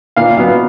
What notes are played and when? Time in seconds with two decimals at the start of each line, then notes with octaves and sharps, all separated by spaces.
0.16 A#2 F5
0.37 F#3 B3 F5